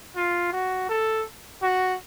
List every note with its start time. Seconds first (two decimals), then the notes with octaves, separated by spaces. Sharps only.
0.16 F4
0.53 F#4
0.89 A4
1.62 F#4